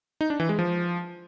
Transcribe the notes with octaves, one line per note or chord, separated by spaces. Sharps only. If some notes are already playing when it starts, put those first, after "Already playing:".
D#4
D4
E3
G#3
F3